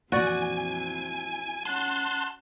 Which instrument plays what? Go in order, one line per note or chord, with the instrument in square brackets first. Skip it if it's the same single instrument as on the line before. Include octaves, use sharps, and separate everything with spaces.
[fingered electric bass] F2 A#2 E3 [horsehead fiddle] C4 E4 [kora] F#4 D5 [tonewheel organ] G#5
[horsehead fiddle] C#4 F#5 [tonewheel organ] A5 C6 F#6